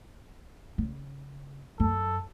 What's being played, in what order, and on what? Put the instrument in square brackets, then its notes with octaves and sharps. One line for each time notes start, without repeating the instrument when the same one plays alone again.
[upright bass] C#3
[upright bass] F#2 [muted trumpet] A4